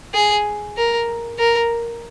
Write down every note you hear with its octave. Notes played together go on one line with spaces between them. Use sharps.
G#4
A#4
A#4